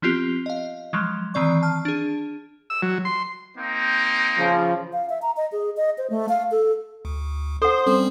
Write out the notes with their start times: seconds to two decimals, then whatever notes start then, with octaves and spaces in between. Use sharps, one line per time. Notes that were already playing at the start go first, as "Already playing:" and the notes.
0.02 F3 B3 C4 F4 G4
0.46 D#5 F5
0.93 F3 F#3 G#3
1.34 D#3 E3 C4 D5 C#6
1.63 A5 F6
1.85 D4 G#4
2.70 E6
2.83 F#3
3.05 C6
3.57 A#3 C4 D#4
4.39 C#3 F3
4.93 F5
5.09 E5
5.22 A#5
5.37 D#5
5.52 G#4
5.77 D#5
5.98 C5
6.10 A3
6.29 F5
6.51 A4
7.05 D2
7.62 A4 C5 F#5 D#6
7.86 G3 C4 C#4 A4